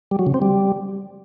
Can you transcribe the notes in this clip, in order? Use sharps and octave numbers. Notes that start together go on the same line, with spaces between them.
G3
F#3
C#3
C4
G3